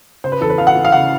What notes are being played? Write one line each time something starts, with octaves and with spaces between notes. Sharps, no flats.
C#3 C5
B4
E2 A4
B4
E2 F5
F#5
E3
F5
C#3 F#5